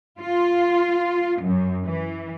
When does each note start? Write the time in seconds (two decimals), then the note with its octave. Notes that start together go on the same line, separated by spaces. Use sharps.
0.20 F4
1.41 F#2
1.86 E3